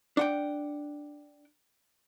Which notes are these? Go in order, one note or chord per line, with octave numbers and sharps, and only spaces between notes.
D4 F#5 G5